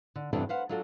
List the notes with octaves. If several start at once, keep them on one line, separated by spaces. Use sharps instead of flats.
D3
E2 G2 C3 E3 D4 A4
B4 C5 F5 F#5
F#3 D4 F4 F#4 A4